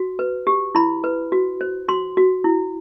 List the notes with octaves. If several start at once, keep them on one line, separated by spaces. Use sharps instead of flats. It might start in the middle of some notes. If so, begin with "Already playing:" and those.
Already playing: F#4
B4
G4
E4 B5
B4
F#4
C5
F#4 C6
F#4
E4